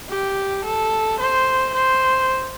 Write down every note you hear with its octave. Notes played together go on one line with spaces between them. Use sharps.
G4
A4
C5
C5